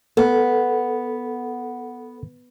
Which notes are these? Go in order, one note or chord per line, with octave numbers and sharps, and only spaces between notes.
B3 A4